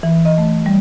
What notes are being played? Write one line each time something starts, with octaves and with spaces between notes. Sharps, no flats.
E3
D#5
A3
G3